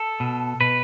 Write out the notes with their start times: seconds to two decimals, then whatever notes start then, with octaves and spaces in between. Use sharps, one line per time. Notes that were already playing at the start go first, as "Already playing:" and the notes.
Already playing: A4
0.20 B2
0.61 B2 B4